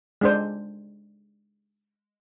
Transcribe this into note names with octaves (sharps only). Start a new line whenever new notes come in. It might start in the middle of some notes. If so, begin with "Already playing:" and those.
G#3 D4 C5